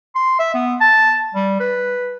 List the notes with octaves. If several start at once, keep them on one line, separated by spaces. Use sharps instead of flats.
C6
E5
B3
A5
G3
B4